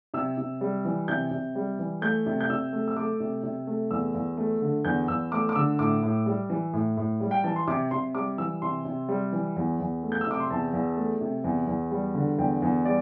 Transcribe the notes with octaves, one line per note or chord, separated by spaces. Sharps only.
C3 E6
C3
G3
E3
C3 G6
C3
G3
E3
A3 G6
C3
G6
C3 E6
A3
E6
A3 D6
C3
C3
A3
E2 E6
E2
A3
D3
E2 G6
E2 E6
A3 D6
D6
D3 E6
A2 D6
A2
G3
E3
A2
A2
G3
G5
E3 A5
C6
C3 D6
C3 C6
G3 D6
E3 E6
C3 C6
C3
G3
E3
E2
E2
A3
G6
E6
C3 D6
C6
E2 A5
E2
A3
C3
E2
E2
G3
D3
E2 G5
E2
G3 D5